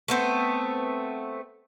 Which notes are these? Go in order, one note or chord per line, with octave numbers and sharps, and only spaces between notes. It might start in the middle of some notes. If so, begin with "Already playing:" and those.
A3 B3 C4